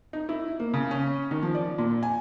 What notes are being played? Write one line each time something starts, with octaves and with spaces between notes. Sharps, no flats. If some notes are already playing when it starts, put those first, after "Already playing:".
D#4
E4
A#3
C#3
C#4
D#3
F3
D5
A#2
G#5